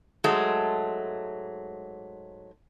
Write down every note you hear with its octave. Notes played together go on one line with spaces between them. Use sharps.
G#2 F#3 G#3 A3